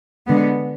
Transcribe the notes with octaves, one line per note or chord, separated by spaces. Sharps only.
D3 G#3 B3